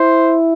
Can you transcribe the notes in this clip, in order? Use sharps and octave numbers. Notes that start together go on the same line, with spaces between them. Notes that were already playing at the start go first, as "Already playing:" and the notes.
Already playing: E4 C5